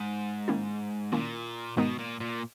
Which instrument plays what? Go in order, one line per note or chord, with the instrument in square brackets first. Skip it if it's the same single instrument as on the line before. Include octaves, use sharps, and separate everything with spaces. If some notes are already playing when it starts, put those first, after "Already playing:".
Already playing: [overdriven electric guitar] G#2
[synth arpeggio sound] D#3 A#3 C#4 E4
[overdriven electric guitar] A#2 [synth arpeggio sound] D#3 A#3 C#4 E4
[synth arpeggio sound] G#2 D#3 G#3 B3 D#4 [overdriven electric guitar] B2
[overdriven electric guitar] A#2
A#2